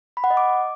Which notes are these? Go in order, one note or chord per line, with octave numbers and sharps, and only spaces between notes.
B5
F#5
D#5
D6